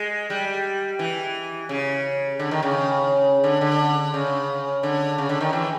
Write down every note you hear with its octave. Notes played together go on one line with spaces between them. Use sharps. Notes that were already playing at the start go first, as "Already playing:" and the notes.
Already playing: G#3
G3
E3
C#3
D3
D#3
C#3
D3
D3
C#3
D3
C#3
D3
D#3
E3